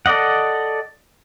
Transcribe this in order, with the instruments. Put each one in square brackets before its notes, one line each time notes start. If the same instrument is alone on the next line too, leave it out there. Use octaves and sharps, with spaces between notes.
[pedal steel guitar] A4 D5 D#5 F#5